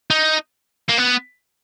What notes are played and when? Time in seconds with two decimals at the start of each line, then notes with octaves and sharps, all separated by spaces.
0.11 D#4
0.89 A#3
0.98 B3